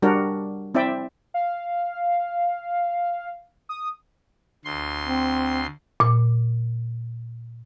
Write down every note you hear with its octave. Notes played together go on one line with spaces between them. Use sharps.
G3 D4 F#4 A#4
C4 E4 D5 E5 G5
F5
D#6
D2 C6
C4
A#2 D6